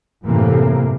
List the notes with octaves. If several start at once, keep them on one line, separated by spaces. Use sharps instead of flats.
F#2 A2 C3 E3 A3 A#3